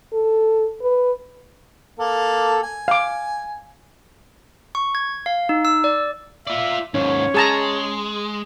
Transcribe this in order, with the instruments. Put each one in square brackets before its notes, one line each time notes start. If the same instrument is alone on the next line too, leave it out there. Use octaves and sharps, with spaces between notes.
[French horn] A4
B4
[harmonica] A#3 A4
G#5
[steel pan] F5 D6
[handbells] C#6
G#6
F5
D#4
E6
D5
[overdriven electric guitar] F4 D5 [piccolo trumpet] E5
[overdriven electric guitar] D#2 G#2 [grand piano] C#4 [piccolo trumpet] C#5
[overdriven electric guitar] G#3 [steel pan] G#4 A5 A#5